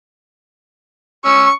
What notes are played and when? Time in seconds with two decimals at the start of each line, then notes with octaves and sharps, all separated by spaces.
1.25 C#4 C#6 E6